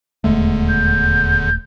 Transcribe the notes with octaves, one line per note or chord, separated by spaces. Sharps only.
D#1 E2 D3 G#3 A3
G6